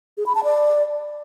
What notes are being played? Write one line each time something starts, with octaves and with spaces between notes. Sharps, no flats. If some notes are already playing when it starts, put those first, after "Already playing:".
G#4
B5
A5
D5